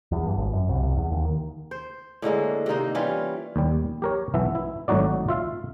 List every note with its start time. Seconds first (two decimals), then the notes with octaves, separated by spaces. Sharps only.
0.12 E2
0.26 G2
0.38 G#1
0.53 F#2
0.69 C2
0.83 C2
0.97 E2
1.11 D#2
1.25 D#3
1.71 C5
2.22 A2 D3 G#3 A#3
2.66 C3 D#3 A#3 D#4
2.95 E3 G3 C#4 F4
3.56 D#2 G3
4.02 G4 A#4 C#5
4.34 B1 E3 B3 E5
4.55 E4
4.88 G#1 A2 F#3 D#4 F#4 D5
5.29 F4 E5 F5